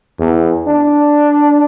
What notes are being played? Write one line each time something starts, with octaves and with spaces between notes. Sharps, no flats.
E2
D4